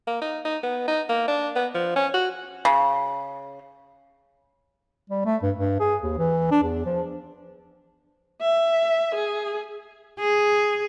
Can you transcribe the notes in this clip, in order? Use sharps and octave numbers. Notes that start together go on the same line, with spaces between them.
A#3
D#4
D#4
B3
D#4
A#3
D4
B3
F3
C#4
F#4
C#3
G3
A3
G2
G2
G#4
D#2
E3
D4
E2
F3
E5
G#4
G#4